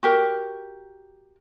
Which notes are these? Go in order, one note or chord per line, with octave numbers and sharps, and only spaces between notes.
F#4 G4 A#4